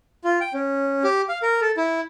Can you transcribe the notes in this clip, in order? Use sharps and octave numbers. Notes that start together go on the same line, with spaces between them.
F4
G5
C#4
G4
F5
A#4
A4
E4